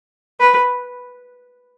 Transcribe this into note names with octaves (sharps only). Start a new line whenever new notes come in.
B4